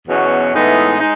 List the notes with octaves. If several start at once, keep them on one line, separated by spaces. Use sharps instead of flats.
E2 B2 F#3 C#4 F#4
A2 E3 G#3 B3 D#4
G#3 D#4